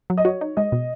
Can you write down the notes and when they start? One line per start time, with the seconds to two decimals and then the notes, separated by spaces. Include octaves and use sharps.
0.10 F#3
0.18 D#5
0.25 F#4 C#5
0.41 D#4
0.57 G#3 D#5
0.72 B2